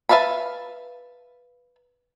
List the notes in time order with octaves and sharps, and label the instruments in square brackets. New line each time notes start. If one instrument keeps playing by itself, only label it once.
[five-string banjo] B4 E5 F5 A5 B5